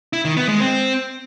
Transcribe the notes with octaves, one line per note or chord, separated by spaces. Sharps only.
E4
D#3
B3
G#3
C4